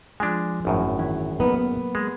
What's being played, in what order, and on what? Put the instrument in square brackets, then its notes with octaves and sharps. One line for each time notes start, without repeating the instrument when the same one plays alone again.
[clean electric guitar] F3 F4 G#5 [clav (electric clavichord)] G#3 D4
[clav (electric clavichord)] G#1 F#2 A2
[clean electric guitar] D#3 E3 E4
[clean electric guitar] F#3 A#3 [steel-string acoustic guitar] B3 D#4
[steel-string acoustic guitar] B3
[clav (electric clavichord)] G#3